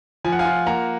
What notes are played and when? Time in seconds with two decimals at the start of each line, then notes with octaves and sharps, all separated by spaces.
0.24 F3 G#5
0.32 F#5
0.39 F5 G#5
0.45 F4
0.66 A#3 F#5 A#5